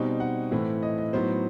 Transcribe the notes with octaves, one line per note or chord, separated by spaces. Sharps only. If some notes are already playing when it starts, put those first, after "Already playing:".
Already playing: B2 G3 C4 D#4 G5
F#5
A2 E3 A3 C4 E4
D#5
D#5
A2 F#3 B3 D#4 C5